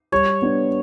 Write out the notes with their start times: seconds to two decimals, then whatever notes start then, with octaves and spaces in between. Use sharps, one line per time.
0.12 G3 C#5
0.42 B3 D4